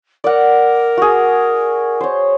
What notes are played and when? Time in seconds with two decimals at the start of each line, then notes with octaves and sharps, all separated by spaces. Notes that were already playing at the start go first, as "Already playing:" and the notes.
0.24 A#4 D5 F#5
0.97 F#4 G#4
2.01 C5 C#5